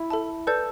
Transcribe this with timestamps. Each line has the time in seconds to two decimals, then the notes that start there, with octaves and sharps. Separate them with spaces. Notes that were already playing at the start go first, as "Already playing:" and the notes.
Already playing: E4
0.10 A4 E5 A5
0.47 A4 B4 D5 A5 G6